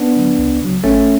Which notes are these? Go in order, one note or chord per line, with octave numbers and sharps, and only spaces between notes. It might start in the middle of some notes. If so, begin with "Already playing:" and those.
Already playing: B3 D4
D3 F#3
C#2
C#3 F#3
G#1 A3 C#4